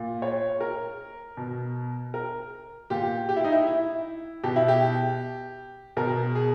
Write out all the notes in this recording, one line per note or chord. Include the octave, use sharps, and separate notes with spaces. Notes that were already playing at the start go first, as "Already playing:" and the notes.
Already playing: A#2
C#5
A#4
B2
A#4
A#2 G4
G4
E4
D#4
E4
E4
B2 G4
E4
G4
B2 A#4
G#4